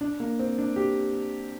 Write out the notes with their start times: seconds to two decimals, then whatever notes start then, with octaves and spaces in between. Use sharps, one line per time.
0.01 D4
0.20 A#3
0.39 C4
0.58 D4
0.76 G4